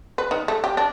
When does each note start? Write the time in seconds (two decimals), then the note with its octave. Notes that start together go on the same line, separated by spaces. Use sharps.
0.18 B4
0.31 D#3
0.48 A3
0.64 G4
0.77 D4